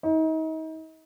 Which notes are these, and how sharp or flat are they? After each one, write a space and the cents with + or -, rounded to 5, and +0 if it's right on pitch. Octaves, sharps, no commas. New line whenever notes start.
D#4 +35